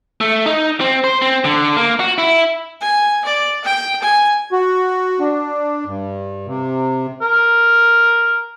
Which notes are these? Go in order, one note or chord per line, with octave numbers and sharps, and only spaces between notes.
A3
D#4
C4
C5
C4
D3
A#3
F#4
E4
G#5
D5
G5
G#5
F#4
D4
G2
C3
A#4